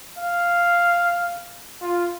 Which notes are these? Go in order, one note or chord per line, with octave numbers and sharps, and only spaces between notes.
F5
F4